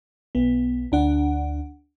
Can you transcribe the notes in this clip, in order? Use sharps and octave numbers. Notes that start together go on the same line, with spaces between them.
B1 B3
D2 D4 F#5